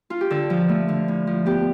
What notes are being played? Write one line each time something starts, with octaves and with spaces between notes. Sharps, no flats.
F4
G4
D3 A4
F3
A3
D3
A2
F3
B3 G4